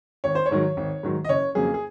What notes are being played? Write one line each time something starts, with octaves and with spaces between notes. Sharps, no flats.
G#1 C#5
C5
C#5
G#2 D#3 F#3
G#1
G#2 D#3 F#3
D#5
F#1 C#5
F2 C#3 F#3 A#3 G#4
G#4